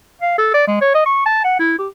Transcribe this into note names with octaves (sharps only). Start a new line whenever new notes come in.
F5
A4
D5
G#3
C#5
D#5
C#6
A5
F#5
E4
G4